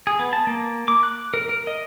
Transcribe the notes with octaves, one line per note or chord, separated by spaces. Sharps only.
G#4
B3
A5
A#3
D6
F#6
A#4
A#4
D#5